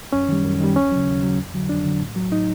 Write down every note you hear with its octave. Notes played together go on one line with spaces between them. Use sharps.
F#2 C#4
D#3 G3
F#2
D#3 G3
D#2 C#4
C#3 F#3
D#2
C#3 F#3
F2
D3 F#3
F2 D4
D3 F#3
A2
F#3
A2 D#4